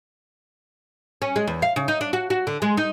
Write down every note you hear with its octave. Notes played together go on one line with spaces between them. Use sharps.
C#4
G#3
E2
F5
C#3
D#4
D4
F#4
F#4
D3
G#3
D#4